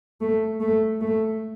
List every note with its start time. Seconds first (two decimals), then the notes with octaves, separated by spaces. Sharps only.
0.21 A3
0.60 A3
1.01 A3